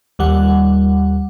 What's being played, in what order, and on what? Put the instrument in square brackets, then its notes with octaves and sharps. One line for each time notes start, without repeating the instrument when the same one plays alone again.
[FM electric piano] D#2 G3 F#5